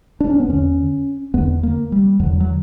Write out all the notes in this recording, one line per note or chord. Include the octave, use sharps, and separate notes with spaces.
D4
C#4
B3
E2 D3 C#4
E2 D3 B3
A#3
G3
E2 D3 F#3
F#3